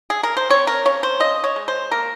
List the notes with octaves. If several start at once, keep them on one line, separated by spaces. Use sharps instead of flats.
G#4
A#4
C5
C4 C#5
A#4
C#3 C#5
C5
C#3 D#5
C#5
G#3
C5
A#3 A#4